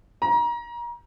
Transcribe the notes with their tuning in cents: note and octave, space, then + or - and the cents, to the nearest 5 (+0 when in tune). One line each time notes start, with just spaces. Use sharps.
A#5 +30